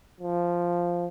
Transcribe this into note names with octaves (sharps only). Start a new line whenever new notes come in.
F3